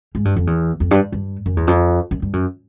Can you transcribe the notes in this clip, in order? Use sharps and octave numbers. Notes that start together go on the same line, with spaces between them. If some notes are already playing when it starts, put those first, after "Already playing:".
G#2
G2
F2
E2
F2
G2
G2
F#2
E2
F2
F#2
G2
F#2